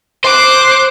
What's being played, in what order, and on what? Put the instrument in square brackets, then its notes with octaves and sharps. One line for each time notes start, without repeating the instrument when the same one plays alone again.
[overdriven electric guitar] C5 [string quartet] D6 F#6